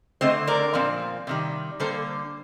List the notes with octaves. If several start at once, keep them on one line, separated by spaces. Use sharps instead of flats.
D3 A3 C4 C5 D#5
A#4 D5
A#2 F3 C4
C3 D#3 G3
D3 G3 A#3 A4 C5